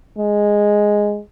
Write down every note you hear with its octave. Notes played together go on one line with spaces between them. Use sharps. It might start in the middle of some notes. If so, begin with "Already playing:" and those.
G#3